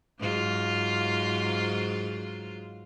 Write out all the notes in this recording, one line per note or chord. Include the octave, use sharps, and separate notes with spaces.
G#2 F#3 F4